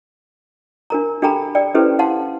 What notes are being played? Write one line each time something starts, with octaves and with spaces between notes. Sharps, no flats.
D4 A#4 A#5
D4 G4 A4 G5 A#5 B5
D5 G5
C#4 E4 G4 A4 B4 C5
F5 F#5 A5 C6